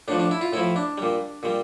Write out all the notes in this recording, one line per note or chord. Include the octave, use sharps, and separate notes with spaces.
A2 F3 D4
D4
E4
F4
A2 F3 E4
D4
A#2 G3
A#2 G3